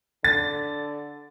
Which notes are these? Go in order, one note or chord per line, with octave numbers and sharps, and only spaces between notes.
D3 A6